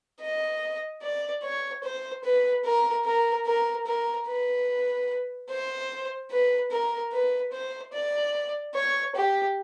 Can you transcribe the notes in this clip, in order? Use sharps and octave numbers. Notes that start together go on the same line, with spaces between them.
D#5
D5
C#5
C5
B4
A#4
A#4
A#4
A#4
B4
C5
B4
A#4
B4
C5
D5
C#5
G4